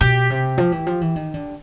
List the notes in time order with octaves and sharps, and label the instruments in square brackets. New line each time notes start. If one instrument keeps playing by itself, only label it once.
[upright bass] B2 [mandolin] G4
[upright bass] C3
F3
E3
F3
E3
D#3
D3